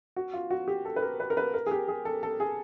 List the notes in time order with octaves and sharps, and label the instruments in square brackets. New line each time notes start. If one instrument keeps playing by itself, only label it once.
[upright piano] F#4
F4
F#4
G4
A4
B4
A#4
B4
A#4
B4
A#4
G#4
G4
G#4
A4
A4
G#4